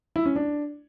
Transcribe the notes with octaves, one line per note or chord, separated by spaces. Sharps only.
E4
C#4
D4